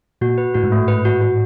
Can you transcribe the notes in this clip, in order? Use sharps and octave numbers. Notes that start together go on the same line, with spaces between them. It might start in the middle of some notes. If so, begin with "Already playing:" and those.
A#2 F#4
B4
A2 F#4
G#2
A2 A3
G#2 B4
F#4
F#4